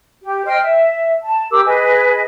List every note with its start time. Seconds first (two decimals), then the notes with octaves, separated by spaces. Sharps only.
0.23 G4
0.46 C5 D#5 G5 F6
0.60 E5
1.23 A5
1.51 G4 A#4 D6 E6
1.65 G#4 B4 D#5 G#5